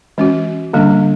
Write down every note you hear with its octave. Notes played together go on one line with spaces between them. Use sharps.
E3 G#3 C#4 F#4
D3 G3 A#3 D4